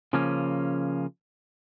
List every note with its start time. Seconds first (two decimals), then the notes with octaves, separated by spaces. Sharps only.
0.13 C#3 F3 A#3 C#4